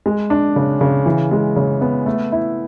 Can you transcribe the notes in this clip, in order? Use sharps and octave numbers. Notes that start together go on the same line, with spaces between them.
G#3
D4
C#3
C#3
E3
G#3
C#3
B3
A3
E4